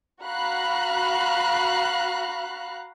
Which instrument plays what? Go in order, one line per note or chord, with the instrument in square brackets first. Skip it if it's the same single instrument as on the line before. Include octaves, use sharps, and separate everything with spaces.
[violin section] F#4 F5 A#5 B5 F#6